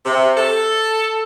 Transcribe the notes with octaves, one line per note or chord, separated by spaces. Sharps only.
C3
A4